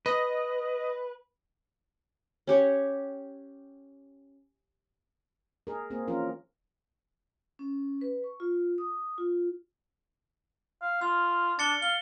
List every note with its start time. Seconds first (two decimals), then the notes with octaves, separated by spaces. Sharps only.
0.06 B4 D#5
2.47 C#4 G4 C#5
5.67 G#4 A#4
5.90 A#3 C4 G#4
6.08 E3 F3 C#4 F4 A#4
7.59 C#4
8.01 B4
8.24 C#6
8.40 F4
8.78 D#6
9.18 F4
10.82 F5
11.01 F4 F6
11.59 D4 A6 C#7 G7
11.82 F5 G7